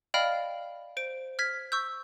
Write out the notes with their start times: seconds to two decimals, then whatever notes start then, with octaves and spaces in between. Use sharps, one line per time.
0.14 D5 D#5 F5 G5 B5 F6
0.97 C5 D7
1.39 F6 G#6 B6
1.72 C#6 E6 G6